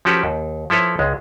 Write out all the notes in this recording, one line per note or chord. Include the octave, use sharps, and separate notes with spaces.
F3 C#4 F#4 G4 A4 B4
D#2
F3 E4 A4 B4 C#5
C#2 G#3